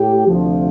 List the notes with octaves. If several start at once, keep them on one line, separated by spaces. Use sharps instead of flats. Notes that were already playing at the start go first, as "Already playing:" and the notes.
Already playing: A2 G4
D2 C3 F3